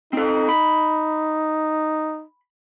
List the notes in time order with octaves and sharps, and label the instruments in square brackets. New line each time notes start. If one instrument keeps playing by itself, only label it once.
[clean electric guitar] C4 A4 [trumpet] D#4
[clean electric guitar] B5